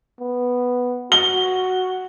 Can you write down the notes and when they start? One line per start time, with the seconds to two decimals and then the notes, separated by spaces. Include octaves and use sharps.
0.20 B3
1.12 F#4 G7